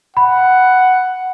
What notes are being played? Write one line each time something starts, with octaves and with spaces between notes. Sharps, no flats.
F#5 B5